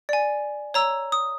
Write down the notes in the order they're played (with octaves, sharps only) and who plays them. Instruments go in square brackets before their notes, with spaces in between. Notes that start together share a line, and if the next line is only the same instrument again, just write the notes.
[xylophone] D5 G#5
C#5 A#5 E6
D#6